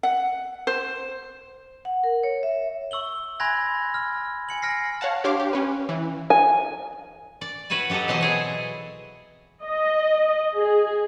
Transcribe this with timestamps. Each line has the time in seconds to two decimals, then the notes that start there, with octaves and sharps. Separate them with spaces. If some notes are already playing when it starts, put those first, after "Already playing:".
0.03 F#5
0.67 C5
1.85 F#5
2.04 A#4
2.23 C#5
2.43 E5
2.91 C#6 E6 F#7 G7
3.40 G#5 B5 C6 F#6 G#6 A#6
3.94 F6
4.49 G#5 C#7 F#7
4.62 G#5 F6 A#6 C7
5.01 C#5 F5 F#5 A5
5.24 D4 G4 C#5 F5 C6 D6
5.40 G4
5.53 C#4 B4
5.89 E3
6.30 G#5
7.41 D5
7.70 F#4 B4 C#5 E5 G#5
7.90 F#3 G4 A4 D#5 A#5
8.08 B2 E3 F#3 C4 C5 D#5
8.21 E4 G#4 C#5
9.63 D#5
10.56 G#4